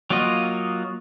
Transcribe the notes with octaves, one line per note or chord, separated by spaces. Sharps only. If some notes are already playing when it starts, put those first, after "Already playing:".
F#3 A#3 F4 F#4 D#5